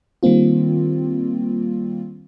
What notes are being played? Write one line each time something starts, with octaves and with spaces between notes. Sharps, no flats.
D#3 G3 A#3 C4 F4